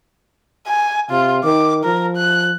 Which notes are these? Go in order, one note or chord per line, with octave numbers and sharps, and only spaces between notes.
G#5
C3 F4
D#3 D6
F3 A#4
F#6